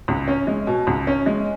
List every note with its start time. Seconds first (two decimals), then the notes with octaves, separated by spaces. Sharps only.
0.08 C#2
0.28 C#4
0.47 G#3
0.67 B2
0.87 C#2
1.07 C#4
1.26 G#3